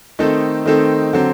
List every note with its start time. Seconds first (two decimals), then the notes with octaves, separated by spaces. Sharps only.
0.19 D#3 A3 C4 D#4 A4
0.65 D#3 A3 C4 D#4 A4
1.13 D3 F#3 C4